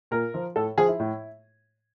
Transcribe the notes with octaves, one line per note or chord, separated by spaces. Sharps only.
A#2 A#4
F3
A2 A4
F3 G#4
E4
A2